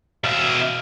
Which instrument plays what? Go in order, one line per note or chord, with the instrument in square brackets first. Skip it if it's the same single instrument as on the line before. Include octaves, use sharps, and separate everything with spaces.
[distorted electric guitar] B2 E5 [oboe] F5